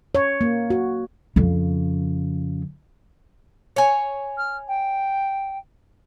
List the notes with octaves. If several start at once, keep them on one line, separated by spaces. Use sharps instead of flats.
C#5
A#3
F#4
F2 C#3
C#5 G#5
F6
G5